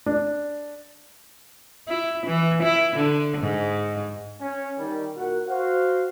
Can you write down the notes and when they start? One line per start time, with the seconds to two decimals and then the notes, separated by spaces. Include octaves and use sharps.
0.06 D4
1.88 E4
2.27 E3
2.63 E4
2.96 D3
3.41 G#2
4.41 C#4
4.79 D#3 G3
5.17 A#2 F#4 A#4 F#5
5.49 F#4 C5 F5